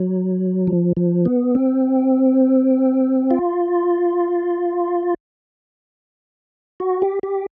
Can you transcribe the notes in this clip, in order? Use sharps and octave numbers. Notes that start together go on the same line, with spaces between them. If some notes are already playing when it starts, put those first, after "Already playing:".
Already playing: F#3
F3
F3
B3
C4
F4
F#4
G4
G4